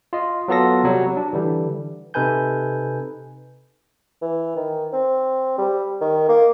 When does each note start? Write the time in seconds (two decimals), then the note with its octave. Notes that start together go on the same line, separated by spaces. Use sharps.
0.13 F4 D#5
0.48 F#3 B3 F4 A4 A#6
0.83 C3 F#3 G3
1.17 D4
1.33 D3 E3 G3
2.14 C3 D#4 A4 B4 G#5 G6
4.22 E3
4.56 D#3
4.93 C4
5.58 G3
6.01 D#3
6.28 A#3